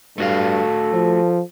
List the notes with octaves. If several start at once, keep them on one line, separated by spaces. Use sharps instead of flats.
G2 A3 F#4 A4 F5
F3